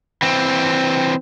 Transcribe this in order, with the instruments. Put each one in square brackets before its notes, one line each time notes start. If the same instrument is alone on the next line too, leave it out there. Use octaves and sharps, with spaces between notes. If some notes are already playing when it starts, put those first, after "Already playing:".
[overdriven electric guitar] E3 C4